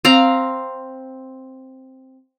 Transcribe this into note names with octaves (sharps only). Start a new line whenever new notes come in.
C4 F5 A#5